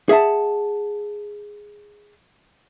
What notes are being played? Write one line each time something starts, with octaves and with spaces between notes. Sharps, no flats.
G#4 E5 F#5 A5